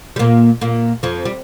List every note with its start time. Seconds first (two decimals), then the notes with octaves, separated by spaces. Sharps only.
0.16 G3
0.19 A#2 A#3
0.61 A#2 A#3
1.03 F2 F3
1.25 G3